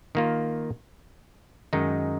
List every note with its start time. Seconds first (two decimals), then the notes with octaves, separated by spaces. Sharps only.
0.15 D#3 A#3 F4
1.73 F#2 D#3 G#3 D#4